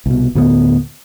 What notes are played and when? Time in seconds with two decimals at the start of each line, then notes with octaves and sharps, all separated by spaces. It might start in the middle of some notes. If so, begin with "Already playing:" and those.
0.06 C2 B2
0.35 D2 A2 D#3 B3